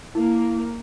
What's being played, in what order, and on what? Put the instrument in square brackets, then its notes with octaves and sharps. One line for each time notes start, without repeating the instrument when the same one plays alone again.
[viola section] A#3 [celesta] E4